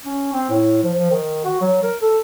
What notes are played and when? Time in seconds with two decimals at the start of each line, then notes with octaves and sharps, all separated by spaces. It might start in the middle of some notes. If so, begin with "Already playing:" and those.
0.05 C#4
0.33 C4
0.50 A2
0.83 F3
0.98 F3
1.11 D#3
1.45 F#4
1.61 F#3
1.83 A#4
2.02 A4